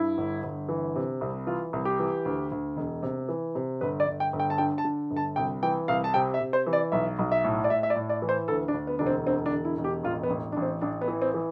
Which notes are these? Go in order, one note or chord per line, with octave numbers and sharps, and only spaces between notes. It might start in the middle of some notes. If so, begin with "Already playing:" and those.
Already playing: G2 E4
G1
G1
E3
C3
C2
E3 F4
C2
G4
E3
D2
D2
E1
C3
E3
C3
G1 B4
D5
G1
G5
G1
G5
A5
D3 G5
A5
D3
G1
A5
C2 G5
E3 G5
C2 F5
A5
C3 G5
E5
C3
C5
E3
D5
B1 E5
B1
E5
A2
D5
A2 E5
E5
D5
A2
D5
E3
C5
D2 A4
D4
D2
B3
E1 D4
C4
D3 C4
D4
E1
E4
E1
G4
A1 F4
B3
A1
A1 D4
C4
A1 D4
B3
E3
C4
E3